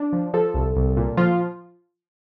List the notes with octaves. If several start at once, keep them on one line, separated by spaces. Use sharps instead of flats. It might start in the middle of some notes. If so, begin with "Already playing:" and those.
Already playing: D4
F3
F3 A4
C2
C2
A#2
F3 F4